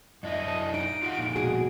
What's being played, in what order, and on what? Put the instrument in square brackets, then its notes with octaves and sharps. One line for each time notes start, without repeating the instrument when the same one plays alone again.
[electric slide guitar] F#2 D4 E4 [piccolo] D#5
[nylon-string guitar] C#5 A5
[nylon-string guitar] D#4 [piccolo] D7
[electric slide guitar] F4 G4 F#5
F2 A#2
[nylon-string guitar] B2 F#4 G#4